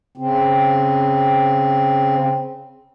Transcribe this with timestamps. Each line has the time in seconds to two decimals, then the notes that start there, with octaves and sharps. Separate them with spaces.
0.17 C#3 C4